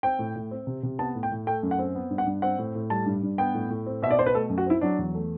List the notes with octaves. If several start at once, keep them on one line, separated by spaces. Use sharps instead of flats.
C4 G5
A2
A2
C4
C3
C3
B3 A5
A2
G5
A2
A3 G5
F#2
F#5
C4
B3
G2
F#5
G2
C4 F#5
A2
A2
G3 A5
G2
G2
B3 G5
A2
A2
C4
B2 E5
D5
B2 C5
B4
A3 A4
F#2
F#4
C4 E4
F#3 D4
E2
A3